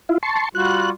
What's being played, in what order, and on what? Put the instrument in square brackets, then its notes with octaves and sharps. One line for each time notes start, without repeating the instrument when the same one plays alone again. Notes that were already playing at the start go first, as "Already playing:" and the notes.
[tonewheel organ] E4 F4
A5 C6 C#6
[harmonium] G3 F4 F#4 [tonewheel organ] F#6